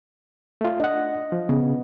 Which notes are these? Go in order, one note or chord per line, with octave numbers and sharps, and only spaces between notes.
A3 F4
D4 D#5 F#5
F3
C#3 B3